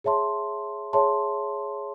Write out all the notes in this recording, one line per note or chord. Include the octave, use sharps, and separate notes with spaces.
G#4 C#5 E5 A5 C6
G#4 C#5 E5 A5 C6